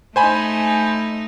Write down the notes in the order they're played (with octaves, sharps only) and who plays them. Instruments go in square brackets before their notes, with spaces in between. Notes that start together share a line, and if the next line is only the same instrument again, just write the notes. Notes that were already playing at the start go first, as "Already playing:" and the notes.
[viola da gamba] A3 D#4 [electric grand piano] C5 G#5 B5